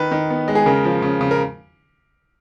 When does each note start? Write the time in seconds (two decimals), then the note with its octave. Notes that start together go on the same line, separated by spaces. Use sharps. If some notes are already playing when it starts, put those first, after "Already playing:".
Already playing: D#3 B4
0.11 D#3
0.30 B3
0.48 G#3
0.55 G#4
0.66 C#3 A#4
0.85 F3
1.02 C#3
1.21 C#3
1.31 A#4